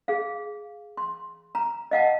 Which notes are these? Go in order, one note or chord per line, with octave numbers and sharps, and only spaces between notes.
G#4 F5
C6
A#5
D#5 F5 F#5 A5